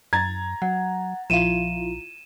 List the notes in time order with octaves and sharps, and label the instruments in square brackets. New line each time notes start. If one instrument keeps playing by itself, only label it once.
[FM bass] F#2 [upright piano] A#5 G#6 A6
[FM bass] F#3 [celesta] F#5
[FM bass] A#1 [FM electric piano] F3 E4 F4 [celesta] D#7 E7